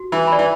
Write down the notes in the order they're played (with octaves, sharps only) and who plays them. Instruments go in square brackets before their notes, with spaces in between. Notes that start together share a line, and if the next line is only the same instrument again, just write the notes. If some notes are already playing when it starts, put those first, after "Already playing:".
Already playing: [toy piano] F#4
[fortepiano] E3
[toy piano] D5 B5
[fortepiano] E3